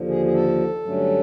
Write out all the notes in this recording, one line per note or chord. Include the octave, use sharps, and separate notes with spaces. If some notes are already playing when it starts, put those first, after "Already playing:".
Already playing: D#2 D3 F3
G#4
G#4
A4
G2 D3 F#3 A3 C#4